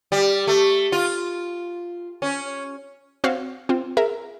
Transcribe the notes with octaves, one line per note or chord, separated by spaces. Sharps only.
G3
A3
F4
C#4
C4 F#4 C#5 F5 F#5
C4 F4
G#4 A#4 E5